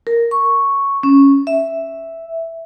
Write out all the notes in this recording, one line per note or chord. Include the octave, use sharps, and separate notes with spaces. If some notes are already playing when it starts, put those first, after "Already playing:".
A#4
C#6
C#4
E5